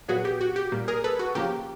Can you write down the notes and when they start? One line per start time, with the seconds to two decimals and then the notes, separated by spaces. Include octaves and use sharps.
0.08 A#2 F#3 B3 F#4 G#4
0.25 G4
0.41 F#4
0.56 G4
0.72 A#2 G3 A#3
0.88 G#4 A#4
1.04 A4 B4
1.19 F#4
1.35 C#3 F3 A#3 G4